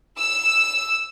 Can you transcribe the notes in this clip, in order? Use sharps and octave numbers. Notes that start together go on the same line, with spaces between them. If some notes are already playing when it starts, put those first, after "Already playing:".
E6